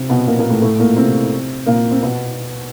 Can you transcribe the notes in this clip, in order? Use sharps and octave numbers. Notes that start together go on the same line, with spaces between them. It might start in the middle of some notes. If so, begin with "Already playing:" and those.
Already playing: C3 C4
B2 B3
A#2 A#3
A#2 A#3
A2 A3
A2 A3
A#2 A#3
C3 C4
A#2 A#3
C4
B2 B3